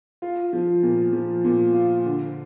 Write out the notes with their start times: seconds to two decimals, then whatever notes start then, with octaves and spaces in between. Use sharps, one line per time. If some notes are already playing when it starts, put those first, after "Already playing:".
0.22 F4
0.53 F3
0.83 A#2
1.13 F3
1.44 A#2
1.74 F4
2.05 D3